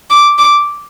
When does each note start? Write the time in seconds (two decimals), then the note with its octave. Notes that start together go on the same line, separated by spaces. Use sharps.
0.10 D6
0.38 D6